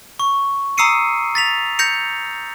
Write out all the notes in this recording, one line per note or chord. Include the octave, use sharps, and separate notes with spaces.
C#6
A#5 D#6 E6 C7 C#7 D#7
A6 B6 F7
G6 A#6 C#7 F7